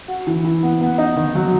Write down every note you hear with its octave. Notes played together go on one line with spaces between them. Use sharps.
F#4
E3
E3
B3
B3
D#4
D#3
F#3